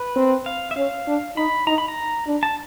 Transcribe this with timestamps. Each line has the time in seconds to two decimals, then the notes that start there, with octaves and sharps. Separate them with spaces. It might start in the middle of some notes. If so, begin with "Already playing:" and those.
Already playing: B4
0.16 C4
0.46 F5
0.71 E5
0.76 C#4 F5
1.07 D4
1.37 D#4 B5
1.67 D#4 A#5
1.78 B5
1.88 A#5
2.27 D4
2.43 A5